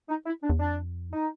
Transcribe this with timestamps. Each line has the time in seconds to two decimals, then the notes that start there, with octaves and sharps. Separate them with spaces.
0.09 D#4
0.26 E4
0.42 D4
0.49 E2
0.60 F2 D4
1.11 D#4